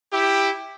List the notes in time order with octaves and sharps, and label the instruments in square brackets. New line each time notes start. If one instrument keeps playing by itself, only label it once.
[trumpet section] E4 G4